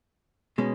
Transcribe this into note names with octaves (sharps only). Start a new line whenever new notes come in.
B2 G#3 C#4